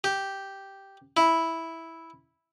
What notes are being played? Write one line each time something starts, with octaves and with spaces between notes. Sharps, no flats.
G4
E4